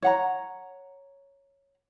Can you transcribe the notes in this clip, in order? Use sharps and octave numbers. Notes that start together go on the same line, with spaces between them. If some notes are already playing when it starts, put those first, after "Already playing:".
C#5 F#5 A#5